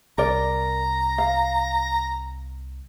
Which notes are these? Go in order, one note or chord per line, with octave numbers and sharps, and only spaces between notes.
C2 A#4 D5 A#5
F5